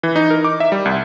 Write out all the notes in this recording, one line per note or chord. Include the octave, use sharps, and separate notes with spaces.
E3
D#4
A#4
D6
E5
G3
C2